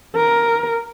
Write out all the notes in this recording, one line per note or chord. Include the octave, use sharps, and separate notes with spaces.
A#4